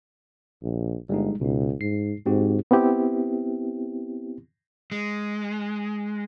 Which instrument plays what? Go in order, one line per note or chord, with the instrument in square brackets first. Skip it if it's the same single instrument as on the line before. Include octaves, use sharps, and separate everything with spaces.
[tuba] A#1
[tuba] G1 [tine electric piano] G3 G#3 D#4
[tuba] C#2 [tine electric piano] B2 D#4
[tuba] G#2 [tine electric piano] C7
[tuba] G#2 [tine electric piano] C4 F#4 G4
[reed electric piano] B3 C4 E4 G4
[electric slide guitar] G#3